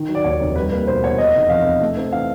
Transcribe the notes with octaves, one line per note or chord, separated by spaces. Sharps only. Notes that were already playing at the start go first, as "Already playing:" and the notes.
Already playing: D#3
F#3
D5
D#2 C#5
F1
G3 B4
A#3 B4
B2 C5
E2 C#5
C3 D#5
F1
F2 F5
F1
A3
C4
E3 F5